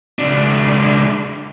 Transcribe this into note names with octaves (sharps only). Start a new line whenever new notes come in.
C#2 D4